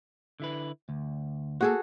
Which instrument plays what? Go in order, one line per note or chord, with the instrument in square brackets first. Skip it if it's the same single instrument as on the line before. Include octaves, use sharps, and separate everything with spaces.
[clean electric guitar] D3 E4 B4
D2
[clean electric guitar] A#3 [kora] F#4 G#4 A4